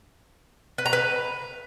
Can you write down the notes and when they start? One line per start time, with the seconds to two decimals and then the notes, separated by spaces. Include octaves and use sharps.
0.78 B4
0.86 A#5
0.93 B4